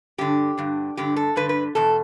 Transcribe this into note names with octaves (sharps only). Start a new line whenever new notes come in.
G2 D3 G4
G2 D3
G2 D3 G4
A4
G2 D3 B4
B4
E2 B2 A4